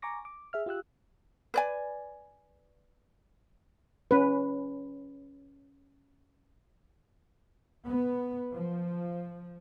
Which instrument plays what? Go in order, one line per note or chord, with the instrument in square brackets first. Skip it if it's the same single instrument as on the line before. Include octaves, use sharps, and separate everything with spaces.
[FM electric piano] G#5 A#5 C#6 D6 A#6
D6
G#4 E5 F6
F4 G4 E6 F#6
[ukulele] B4 D5 G#5
[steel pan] C#4 B4
[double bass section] B3
F3